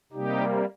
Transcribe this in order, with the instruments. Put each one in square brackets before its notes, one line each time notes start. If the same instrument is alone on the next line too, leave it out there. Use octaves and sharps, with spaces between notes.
[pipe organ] C3 G3 A#3 D#4 G4